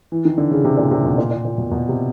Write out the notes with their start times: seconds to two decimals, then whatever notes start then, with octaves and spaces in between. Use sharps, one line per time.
0.12 E3
0.25 D#3
0.38 D3
0.51 C#3
0.65 C3
0.77 A#2
0.91 C3
1.05 B2
1.18 A#2
1.31 A#2
1.45 A#2
1.58 B2
1.71 B2
1.89 C3